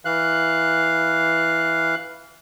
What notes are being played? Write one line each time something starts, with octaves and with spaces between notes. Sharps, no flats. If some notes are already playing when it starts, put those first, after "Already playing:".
E3 F5 F#6